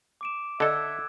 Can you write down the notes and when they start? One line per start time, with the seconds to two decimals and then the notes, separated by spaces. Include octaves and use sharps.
0.21 D6 D7 E7
0.60 D3 A4 D#5 E5 E6 F#6 G#6